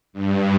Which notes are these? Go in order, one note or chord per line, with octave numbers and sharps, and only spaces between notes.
G2